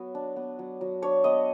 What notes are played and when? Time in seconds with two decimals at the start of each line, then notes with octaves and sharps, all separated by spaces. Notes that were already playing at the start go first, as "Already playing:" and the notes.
Already playing: F#3 B3
0.15 D4
0.36 B3
0.59 F#3
0.81 F#3
1.02 D4 C#5
1.24 B3 D#5